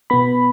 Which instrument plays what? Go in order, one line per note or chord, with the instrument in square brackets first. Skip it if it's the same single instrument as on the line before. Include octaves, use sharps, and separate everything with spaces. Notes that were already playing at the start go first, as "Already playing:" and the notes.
[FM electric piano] B2 B3 B5